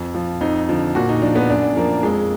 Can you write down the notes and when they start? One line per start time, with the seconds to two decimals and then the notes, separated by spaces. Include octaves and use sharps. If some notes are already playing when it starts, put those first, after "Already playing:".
Already playing: F2
0.15 F3
0.41 F2 D#4
0.69 D3 F3
0.95 A#2 F#4
1.09 D#4
1.22 F3 D4
1.36 B3
1.50 F#2 D4
1.76 F3 A#3
2.03 F2 G#3